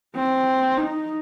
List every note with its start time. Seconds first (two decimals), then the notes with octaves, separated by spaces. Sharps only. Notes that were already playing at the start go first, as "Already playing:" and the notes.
0.16 C4
0.78 D#4